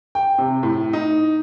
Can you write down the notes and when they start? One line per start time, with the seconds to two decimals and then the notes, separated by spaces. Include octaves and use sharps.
0.15 G5
0.38 C3
0.63 A2
0.93 D#4